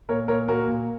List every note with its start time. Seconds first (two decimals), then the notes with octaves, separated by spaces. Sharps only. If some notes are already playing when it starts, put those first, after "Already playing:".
0.09 A#2 A#4 C#5
0.28 A#2 A#4 C#5
0.48 A#2 F#4 A#4
0.68 A#2